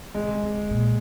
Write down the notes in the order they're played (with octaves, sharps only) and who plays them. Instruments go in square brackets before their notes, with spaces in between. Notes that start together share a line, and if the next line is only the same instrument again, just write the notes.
[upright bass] G#2 [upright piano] G#3
[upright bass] D3
C3
D3
D3
A#2